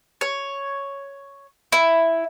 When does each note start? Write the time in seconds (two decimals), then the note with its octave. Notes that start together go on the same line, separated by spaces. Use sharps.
0.21 C#5
1.72 E4